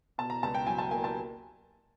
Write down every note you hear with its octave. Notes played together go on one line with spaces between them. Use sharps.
B2 A5
A#5
C#2 A5
G5
F#3 G#5
A5
A#3 G#5
A5